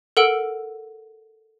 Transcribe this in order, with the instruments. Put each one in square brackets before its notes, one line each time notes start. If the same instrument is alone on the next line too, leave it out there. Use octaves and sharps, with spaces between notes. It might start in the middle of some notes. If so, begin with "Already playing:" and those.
[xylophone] A4 A#4 F#5 E6 D7